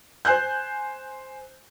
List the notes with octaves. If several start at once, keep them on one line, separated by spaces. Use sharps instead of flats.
C5 G#5 F#6 G6